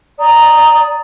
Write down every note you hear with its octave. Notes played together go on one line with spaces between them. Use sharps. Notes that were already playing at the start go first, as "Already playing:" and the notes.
D5 A#5 D#6